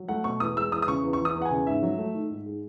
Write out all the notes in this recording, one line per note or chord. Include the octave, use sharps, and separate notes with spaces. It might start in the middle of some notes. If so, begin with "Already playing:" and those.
Already playing: F#3
A3 F#5
B2 C#6
E2 D#6
G#3 E6
E2 D#6
D#6
C#3 C#6
E2
C#6
E3
D#6
E2
F#5
G#5
C#3
G#2 E5
F#3
A3
D#3
G#2
G#3